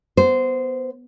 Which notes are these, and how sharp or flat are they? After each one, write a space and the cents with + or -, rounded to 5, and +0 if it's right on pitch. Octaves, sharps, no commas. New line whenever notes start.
B3 +0 C5 -15